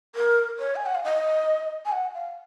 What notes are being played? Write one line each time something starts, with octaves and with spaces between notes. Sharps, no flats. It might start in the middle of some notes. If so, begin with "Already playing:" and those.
A#4
C#5
G#5
F#5
F5
D#5
G#5
F#5
F5